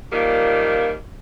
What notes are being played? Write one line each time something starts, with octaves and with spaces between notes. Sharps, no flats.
A#2 D#3 F3 G3 A#3